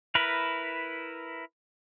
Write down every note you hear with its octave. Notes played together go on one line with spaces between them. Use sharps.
E4 A#4 B4